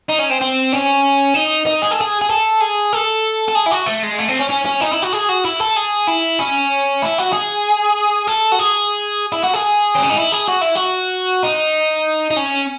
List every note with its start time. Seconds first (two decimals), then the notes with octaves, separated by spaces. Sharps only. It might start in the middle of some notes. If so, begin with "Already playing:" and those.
0.09 D#4
0.19 C#4
0.31 C4
0.41 C4
0.73 C#4
1.35 D#4
1.67 D#4
1.82 G#4
1.91 A4
2.01 G#4
2.22 G#4
2.30 A4
2.61 G#4
2.93 A4
3.48 A4
3.55 G#4
3.66 E4
3.72 F#4
3.86 A3
4.03 G#3
4.19 A3
4.29 C4
4.39 C#4
4.50 C#4
4.66 C#4
4.81 D#4
4.92 E4
5.02 F#4
5.13 G#4
5.29 F#4
5.45 E4
5.61 A4
5.76 G#4
6.07 E4
6.39 C#4
7.02 E4
7.18 F#4
7.33 G#4
8.27 A4
8.52 F#4
8.59 G#4
9.32 E4
9.43 F#4
9.53 G#4
9.95 C4
10.03 C#4
10.09 D#4
10.16 E4
10.32 G#4
10.48 F#4
10.61 E4
10.75 F#4
11.43 D#4
12.30 D#4
12.36 C#4